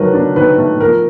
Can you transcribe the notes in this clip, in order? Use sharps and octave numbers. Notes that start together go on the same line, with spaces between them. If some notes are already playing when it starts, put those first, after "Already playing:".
Already playing: D#3 F#3 A3 A#4 B4
D4
D#3 B4
A3
F3 A#4